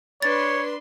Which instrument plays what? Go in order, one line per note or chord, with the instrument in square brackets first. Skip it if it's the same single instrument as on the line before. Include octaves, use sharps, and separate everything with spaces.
[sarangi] D4 [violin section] B4 C6 [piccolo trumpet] C#5 [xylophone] A6